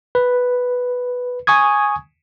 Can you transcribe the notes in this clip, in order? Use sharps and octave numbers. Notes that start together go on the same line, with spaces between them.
B4
G#5 C#6 D#6 G#6